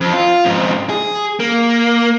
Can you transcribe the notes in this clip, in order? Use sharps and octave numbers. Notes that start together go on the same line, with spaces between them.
F2
F4
F2 G#2
G#4
A#3